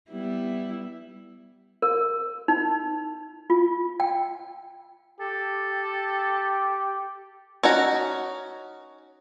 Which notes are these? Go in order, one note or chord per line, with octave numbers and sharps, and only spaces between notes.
G3 B3 E4
A#4
D#4
F4
G5
G4 A4
C#4 D#4 F#4